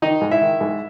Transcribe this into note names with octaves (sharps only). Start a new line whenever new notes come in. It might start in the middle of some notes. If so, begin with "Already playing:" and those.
D#3 D#4 D#5
G#2
E4 E5
D#3
G#2